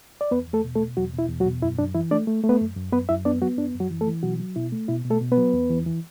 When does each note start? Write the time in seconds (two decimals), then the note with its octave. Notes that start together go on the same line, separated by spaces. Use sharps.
0.21 D5
0.31 E2 B3 B4
0.48 E2
0.53 A3 A4
0.64 B2
0.75 A3 A4
0.81 B2
0.97 E2 F#3 F#4
1.13 B2
1.19 E4
1.29 E2
1.40 F#3 F#4
1.45 B2
1.62 F#2 E4
1.79 F#2 D4
1.95 E3 E4
2.11 A3 D4 D5
2.27 A3
2.44 A3
2.49 B3 B4
2.61 F#2
2.76 F#2
2.93 F#2 B3 B4
3.09 F#2 E4 E5
3.25 B3 D4 D5
3.42 F#3 B3 F#4
3.58 F#2 D4
3.75 F#2
3.80 F#3 F#4
3.90 E3
4.01 A3 A4
4.07 E3
4.23 B2 F#3 F#4
4.39 F#3
4.56 B2 E4
4.72 A3
4.88 B2 E4
5.05 B2
5.10 A3 A4
5.21 B2
5.32 B3 B4
5.37 F#3
5.53 E2
5.70 E3
5.86 E3